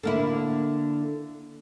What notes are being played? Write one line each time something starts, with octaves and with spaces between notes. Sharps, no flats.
D3 A#3 E4